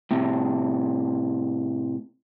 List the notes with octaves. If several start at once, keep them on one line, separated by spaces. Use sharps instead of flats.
A2 C3